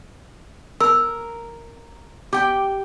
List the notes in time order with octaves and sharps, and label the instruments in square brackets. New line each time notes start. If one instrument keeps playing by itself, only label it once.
[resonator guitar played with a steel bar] A#4 [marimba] E6
[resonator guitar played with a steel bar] G4 G5